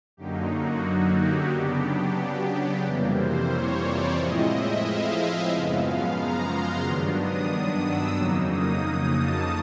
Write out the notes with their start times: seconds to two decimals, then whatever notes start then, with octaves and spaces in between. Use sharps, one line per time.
0.17 F#2 D3 F#3 A#3 D#4 G4
0.51 F#4
1.17 G4
1.50 C#3 F#3 B3 D4 G4
2.51 G4
2.83 F2 C3 E3 G3 A#3
3.16 C5
3.50 C#5
3.83 D5
4.16 A2 F3 G#3 C4 E4 D#5
4.50 E5
4.83 F5
5.50 F#2 C#3 F3 G#3 B3
5.83 F5
6.16 A#5
6.50 C6
6.82 G2 D#3 F#3 B3 D4
7.16 D#6
7.83 E6
8.16 F2 C#3 F#3 A#3 D#4
8.50 D#6
9.16 A5